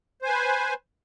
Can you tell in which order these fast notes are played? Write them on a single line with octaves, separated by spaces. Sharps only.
C5 G#5 B4